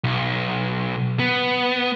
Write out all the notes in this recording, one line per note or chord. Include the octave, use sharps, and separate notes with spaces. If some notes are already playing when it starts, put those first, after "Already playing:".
B1
B3